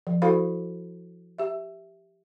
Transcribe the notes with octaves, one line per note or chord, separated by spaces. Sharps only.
F3
E4 F#4 A4 C5 F5 B5
G4 E5